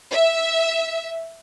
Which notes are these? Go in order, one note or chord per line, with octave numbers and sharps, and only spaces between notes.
E5